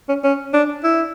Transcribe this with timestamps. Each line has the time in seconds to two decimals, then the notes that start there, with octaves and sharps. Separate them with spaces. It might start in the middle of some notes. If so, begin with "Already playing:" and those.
0.09 C#4
0.24 C#4
0.54 D4
0.84 E4